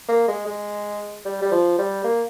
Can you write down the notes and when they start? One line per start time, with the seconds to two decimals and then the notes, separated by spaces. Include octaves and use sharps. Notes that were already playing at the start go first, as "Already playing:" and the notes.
0.08 A#3
0.28 G#3
0.47 G#3
1.25 G3
1.42 G3
1.51 F3
1.78 G3
2.04 A#3